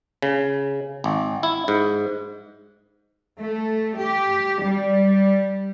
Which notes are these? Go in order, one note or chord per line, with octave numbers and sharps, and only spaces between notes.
C#3
G#1
E4
G#2
A3
G4
G3